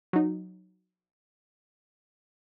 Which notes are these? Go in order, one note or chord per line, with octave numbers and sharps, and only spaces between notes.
F#3 D#4